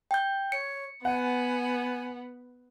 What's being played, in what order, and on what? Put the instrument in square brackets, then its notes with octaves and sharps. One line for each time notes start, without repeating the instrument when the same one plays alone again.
[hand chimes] G5 G6
[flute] C#5 [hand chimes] C#7
[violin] B3 [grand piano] F#5 [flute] G#5